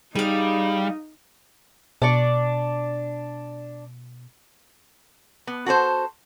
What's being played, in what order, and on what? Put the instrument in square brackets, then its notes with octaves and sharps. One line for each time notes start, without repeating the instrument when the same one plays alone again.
[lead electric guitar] G3 [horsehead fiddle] D#4 [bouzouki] G#4 F5
[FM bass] B2 [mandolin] D4 D5 C#6
[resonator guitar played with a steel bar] B3
F#4 A4 B4 C5